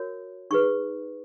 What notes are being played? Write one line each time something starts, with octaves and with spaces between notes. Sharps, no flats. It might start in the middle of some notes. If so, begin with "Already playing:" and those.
Already playing: F#4 A#4 C#5
D#4 G#4 B4 C#6